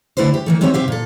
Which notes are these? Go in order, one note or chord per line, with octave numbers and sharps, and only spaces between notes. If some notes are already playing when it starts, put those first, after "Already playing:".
D3 A3 E4 B4 C5
G4
D#3 E3 A3
G#3 C4 D#4 G4 C#5 E5
C3 G4 E5 F5
A#2 A4